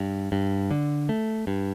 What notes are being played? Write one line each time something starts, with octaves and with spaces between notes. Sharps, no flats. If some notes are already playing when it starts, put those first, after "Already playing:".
Already playing: G2
G2
D3
A3
G2